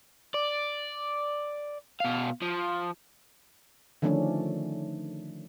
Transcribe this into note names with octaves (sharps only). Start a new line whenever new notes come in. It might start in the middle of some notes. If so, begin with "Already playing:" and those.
D5
B2 F5
F3
D3 D#3 F3 A3 C#4 D4